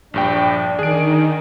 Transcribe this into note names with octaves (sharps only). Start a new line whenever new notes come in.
A#1 G2 D4 G5
D#3 G#4 D7